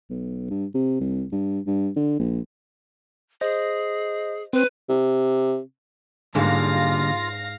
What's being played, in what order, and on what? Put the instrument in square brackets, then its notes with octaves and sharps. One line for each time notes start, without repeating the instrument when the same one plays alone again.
[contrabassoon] B1
G2
C3
C2
G2
G2
D3
A#1
[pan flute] G#4 [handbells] C5 D#5
[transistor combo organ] C4 [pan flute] B4
[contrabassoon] C3
[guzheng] G#2 [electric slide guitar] D3 G3 A#3 [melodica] F4 [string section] F5 A#6